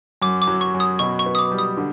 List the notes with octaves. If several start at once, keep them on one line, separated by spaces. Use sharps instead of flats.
F#2 D6
D6
F#3
C#6
F#2
D#6
B2 C#6
C#6
B3
D#6
D6
G3
D#6
D3